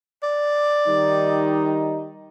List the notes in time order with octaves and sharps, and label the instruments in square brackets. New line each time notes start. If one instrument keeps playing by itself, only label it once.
[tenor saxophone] D5
[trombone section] D#3 G3 D#4